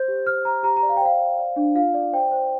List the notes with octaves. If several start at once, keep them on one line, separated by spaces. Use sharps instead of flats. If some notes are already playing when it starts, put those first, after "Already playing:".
Already playing: C5 G6
G4
C5 F6
C5 A#5
G4 A#5
A#5
D5
F5
G5
C5 F5
C5
D5
D4
F4 F5
D5
C5 G5
C5